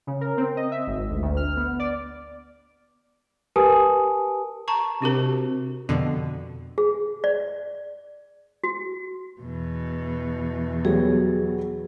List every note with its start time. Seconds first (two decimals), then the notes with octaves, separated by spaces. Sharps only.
0.07 C#3
0.21 A#4
0.37 C4
0.57 D#5
0.71 E5
0.87 G#1
1.10 D2
1.23 D2
1.37 F6
1.57 B3
1.79 D5
3.56 G4 A#4 B4 G#5 A5 D#6
4.68 A5 A#5 C#6
5.02 C3 D4 F#4 A#4
5.89 F2 B2 D3
6.78 G#4
7.24 D5
8.64 F#4
9.41 E2 B2
10.85 F#3 G3 B3 G#4